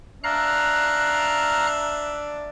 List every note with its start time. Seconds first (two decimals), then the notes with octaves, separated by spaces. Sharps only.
0.24 D4 E5 F5 A#5 F#6